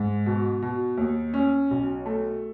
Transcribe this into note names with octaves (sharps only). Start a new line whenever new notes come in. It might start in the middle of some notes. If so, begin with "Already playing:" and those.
Already playing: G#2
B2
B2
D#2
C#4
B1
A3